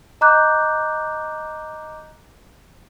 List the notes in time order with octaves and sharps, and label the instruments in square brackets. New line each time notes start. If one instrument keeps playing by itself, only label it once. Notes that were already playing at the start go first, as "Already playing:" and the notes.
[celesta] D#5 A#5 D6 F#6 G6